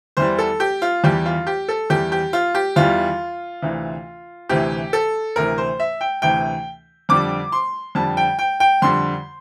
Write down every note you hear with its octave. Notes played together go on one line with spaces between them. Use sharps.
E2 E3 G3 C5
A4
G4
F4
E2 E3 G3 G4
F4
G4
A4
E2 E3 G3 G4
G4
F4
G4
E2 E3 G3 F4
D2 C3 E3
D2 C3 E3 G4
A4
D2 C3 E3 A#4
C5
E5
G5
D2 C3 E3 G5
F2 D3 G3 D6
C6
F2 D3 G3 A5
G5
G5
G5
F2 D3 G3 C6